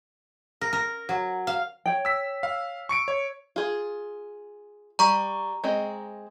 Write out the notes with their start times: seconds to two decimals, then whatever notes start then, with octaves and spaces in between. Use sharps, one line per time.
0.61 A#4
0.73 A#4
1.09 F#3
1.47 F5
1.86 C#5 G5
2.05 E6 B6
2.43 F5
2.89 C#6 C#7 D7
3.08 C#5
3.56 F4 G#4
4.99 G3 A#5 C#6
5.64 G#3 C4 D#5